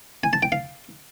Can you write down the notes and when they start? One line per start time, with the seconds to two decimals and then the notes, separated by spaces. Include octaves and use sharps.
0.23 G#5
0.33 A5
0.43 G5
0.52 F5